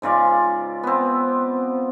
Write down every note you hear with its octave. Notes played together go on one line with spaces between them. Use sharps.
G#2 C#3 F4 D5
B3 C4